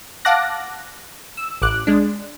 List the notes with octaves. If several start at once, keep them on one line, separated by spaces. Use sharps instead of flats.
F5 F#5 A5 D6 F#6 A#6
E6
A1 D6 F#6
G#3 D4